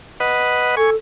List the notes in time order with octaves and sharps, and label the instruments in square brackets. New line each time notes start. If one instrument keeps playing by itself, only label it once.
[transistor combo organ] B4 D#5 F#5
[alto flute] A4 [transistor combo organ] G#5 C#6